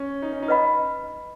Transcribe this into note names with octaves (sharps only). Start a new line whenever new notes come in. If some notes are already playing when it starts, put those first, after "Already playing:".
Already playing: C#4
D#4
C#4
D#4
B4 D#5 F#5 B5